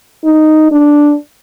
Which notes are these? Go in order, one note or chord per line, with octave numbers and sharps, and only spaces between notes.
D#4
D4